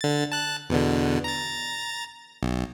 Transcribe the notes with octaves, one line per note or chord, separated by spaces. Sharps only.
D3 A6
A5 F#6
E2 B2 D3
A#5 A6
B1